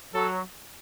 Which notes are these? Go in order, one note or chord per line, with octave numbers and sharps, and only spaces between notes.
F#3 A4